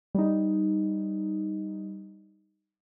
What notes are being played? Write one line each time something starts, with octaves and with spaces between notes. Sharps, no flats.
G3 D#4